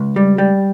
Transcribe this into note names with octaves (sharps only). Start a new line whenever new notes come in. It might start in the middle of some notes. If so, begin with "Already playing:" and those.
Already playing: C#2
G3
G3